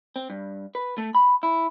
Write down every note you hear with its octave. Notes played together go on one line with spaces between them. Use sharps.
C4
G2
B4
A3
B5
E4